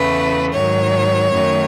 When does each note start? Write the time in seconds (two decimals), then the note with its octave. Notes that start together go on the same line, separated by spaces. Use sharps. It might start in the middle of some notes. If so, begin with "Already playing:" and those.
Already playing: E2 C#3 E3 A3 B4
0.53 G#2 D#3 F#3 C#5
1.30 F#2 D#3 A3